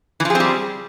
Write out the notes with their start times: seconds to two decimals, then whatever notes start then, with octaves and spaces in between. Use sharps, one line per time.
0.20 E3
0.25 F3
0.30 G#4
0.35 C4
0.40 G3